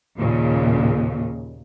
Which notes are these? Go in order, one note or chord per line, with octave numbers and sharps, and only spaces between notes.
D#2 A#2 C#3